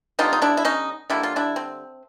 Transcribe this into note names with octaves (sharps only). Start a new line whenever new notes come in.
D3 G3 B3 D#4 F4
D#4
D4 E4
E4
C#4 D#4
D3 G3 A#3 E4
F4
D4 E4
C4